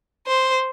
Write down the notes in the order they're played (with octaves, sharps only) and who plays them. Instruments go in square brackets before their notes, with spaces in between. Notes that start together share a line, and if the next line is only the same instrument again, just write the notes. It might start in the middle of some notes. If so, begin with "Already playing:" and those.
[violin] C5